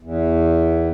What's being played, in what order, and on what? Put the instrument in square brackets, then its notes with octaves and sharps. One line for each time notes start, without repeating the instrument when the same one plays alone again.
[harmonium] E2